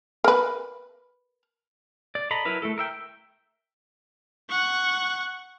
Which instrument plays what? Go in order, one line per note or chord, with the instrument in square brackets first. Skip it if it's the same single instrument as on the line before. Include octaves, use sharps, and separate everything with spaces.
[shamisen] A#4 B4
[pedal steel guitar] D5
A4 D#5 A#5 B5
F#3 E4 A#4 B4
A3 E4 A4
A#4 E5 G5
[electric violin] F#5 C#6